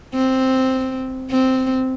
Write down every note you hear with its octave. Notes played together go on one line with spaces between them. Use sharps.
C4
C4